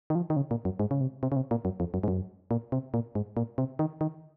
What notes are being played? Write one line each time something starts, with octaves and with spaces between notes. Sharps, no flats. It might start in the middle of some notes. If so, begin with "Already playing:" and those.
D#3
F3
D#3
C#3
A#2
F#2
G#2
C#3
C3
C3
C#3
C3
A#2
F#2
F2
F#2
G#2
F#2
A#2
C3
A#2
G#2
A#2
C3
D#3
D#3